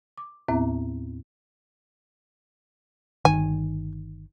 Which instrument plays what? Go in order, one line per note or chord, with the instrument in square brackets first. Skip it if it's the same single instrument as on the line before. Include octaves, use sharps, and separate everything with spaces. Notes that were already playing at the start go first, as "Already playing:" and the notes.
[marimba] D6
D#2 A2 B3 C4 E4 E5
[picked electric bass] G1 D#3 [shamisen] G#5